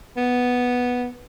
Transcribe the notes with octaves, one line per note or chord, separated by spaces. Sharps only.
B3